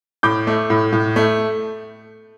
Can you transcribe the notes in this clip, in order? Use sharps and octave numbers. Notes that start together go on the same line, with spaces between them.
A2 D6 G6
A3
A2
A2
A3